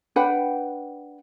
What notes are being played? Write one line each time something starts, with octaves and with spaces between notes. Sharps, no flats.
D4 B4 F#5 G5